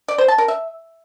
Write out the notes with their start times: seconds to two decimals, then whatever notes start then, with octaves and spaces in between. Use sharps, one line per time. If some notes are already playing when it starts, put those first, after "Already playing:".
0.08 D5
0.18 C5
0.28 A5
0.38 A#4
0.48 E5